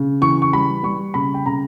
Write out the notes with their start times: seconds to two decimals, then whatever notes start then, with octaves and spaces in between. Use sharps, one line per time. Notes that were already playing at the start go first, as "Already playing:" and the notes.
Already playing: C#3
0.21 E3 C#6
0.42 C#6
0.53 G3 B5
0.83 G3 C#6
1.14 C#3 B5
1.34 G5
1.46 C#3 A#5